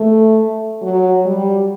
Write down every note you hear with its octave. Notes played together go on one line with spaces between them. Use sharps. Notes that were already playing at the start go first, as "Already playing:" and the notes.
Already playing: A3
F#3
G3